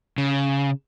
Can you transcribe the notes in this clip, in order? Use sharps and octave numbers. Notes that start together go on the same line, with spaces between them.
C#3